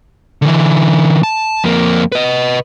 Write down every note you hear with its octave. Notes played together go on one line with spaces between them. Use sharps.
D3 E3
A5
F2 A#3
B4 D#5